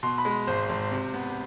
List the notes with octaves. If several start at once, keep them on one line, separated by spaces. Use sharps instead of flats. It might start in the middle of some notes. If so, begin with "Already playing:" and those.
B2 C6
B5
G#3
G#1 C5
G#1
C3
B3